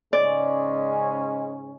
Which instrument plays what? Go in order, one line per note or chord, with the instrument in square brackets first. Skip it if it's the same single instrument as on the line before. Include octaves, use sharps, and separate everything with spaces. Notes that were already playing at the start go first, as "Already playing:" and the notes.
[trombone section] G#2 C#3 C#4 [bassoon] G#3 [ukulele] D5